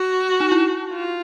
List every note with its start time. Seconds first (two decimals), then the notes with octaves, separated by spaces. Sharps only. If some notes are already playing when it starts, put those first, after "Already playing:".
Already playing: F#4
0.40 D#4
0.52 E4
0.92 F4